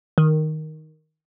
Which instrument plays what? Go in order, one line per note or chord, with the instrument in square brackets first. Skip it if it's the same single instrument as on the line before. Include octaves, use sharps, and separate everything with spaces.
[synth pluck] D#3